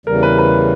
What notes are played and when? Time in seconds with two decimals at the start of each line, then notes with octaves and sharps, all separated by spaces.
0.06 E2 C#3 E3 G3 A#4
0.23 B4
0.39 B4